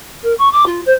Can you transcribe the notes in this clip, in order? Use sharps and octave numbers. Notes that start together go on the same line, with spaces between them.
A#4
C#6
D6
F4
C5